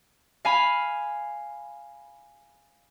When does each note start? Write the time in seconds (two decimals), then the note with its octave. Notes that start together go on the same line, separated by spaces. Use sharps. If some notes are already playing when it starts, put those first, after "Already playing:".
0.45 F5 G#5 B5